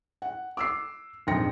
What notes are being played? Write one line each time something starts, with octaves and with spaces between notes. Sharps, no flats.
F#5
D6 E6 C7
A#1 F2 G#2 G5 A#6 C#7